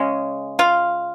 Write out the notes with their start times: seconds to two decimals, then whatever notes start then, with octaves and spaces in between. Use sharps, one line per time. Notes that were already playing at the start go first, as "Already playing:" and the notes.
Already playing: C#3 G#3 C#4
0.59 F4 F5